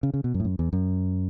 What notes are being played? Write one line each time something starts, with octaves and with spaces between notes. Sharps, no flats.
C#3
C#3
B2
F#2
A2
F#2
E2
F#2